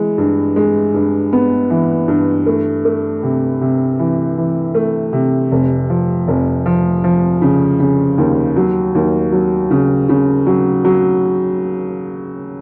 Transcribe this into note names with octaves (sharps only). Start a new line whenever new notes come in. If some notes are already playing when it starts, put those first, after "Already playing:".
Already playing: E3 G#3
G2
G#3
G2
B3
E3
G2
A3
A3
C3
C3
E3
E3
A3
C3
F1
F3
F1
F3
F3
C#3
C#3
D#2
F#3
D#2
F#3
C#3
C#3
F#3
F#3